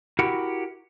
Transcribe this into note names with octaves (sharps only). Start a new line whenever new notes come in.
E4 F#4 G4 A#4 F#5